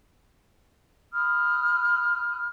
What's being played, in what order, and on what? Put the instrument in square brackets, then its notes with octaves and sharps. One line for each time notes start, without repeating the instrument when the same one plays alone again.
[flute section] B5 D#6 F6 F#6